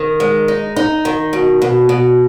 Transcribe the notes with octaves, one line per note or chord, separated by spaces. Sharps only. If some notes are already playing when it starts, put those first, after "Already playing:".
Already playing: D#3
G#3
D#4
D#4
D#3
B2
B2
B2